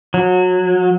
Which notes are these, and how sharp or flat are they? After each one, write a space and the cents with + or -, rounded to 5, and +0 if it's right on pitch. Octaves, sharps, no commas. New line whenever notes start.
F#3 -25